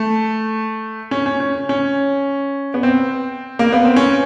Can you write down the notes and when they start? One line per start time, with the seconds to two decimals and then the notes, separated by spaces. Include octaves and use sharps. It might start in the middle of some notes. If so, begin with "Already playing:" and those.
Already playing: A3
1.11 C#4
1.26 C#4
1.40 C#4
1.69 C#4
2.74 B3
2.83 C4
3.59 A#3
3.72 B3
3.85 C4
3.96 C#4